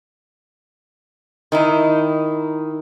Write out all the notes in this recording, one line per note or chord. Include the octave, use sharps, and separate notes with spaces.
D#3 D#4 E4